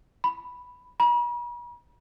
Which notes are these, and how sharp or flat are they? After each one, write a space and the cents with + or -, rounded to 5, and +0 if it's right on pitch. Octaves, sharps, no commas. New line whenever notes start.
B5 +0
B5 -45